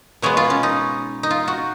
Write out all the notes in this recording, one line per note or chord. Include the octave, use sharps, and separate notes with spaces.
B2 G#3 B3 C#5
F4
C#4
D#4
D#4
F4
F#4